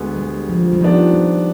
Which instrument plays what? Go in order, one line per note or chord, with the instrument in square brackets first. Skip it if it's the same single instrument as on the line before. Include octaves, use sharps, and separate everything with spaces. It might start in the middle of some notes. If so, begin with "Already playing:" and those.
Already playing: [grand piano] D2 D3 G#3 B3
[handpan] G3
F3
G3
[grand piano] D#3 B3 D4 [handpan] F3
[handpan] G3